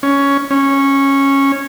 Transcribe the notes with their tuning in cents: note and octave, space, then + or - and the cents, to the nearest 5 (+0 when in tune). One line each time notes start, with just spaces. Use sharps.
C#4 +10
C#4 -10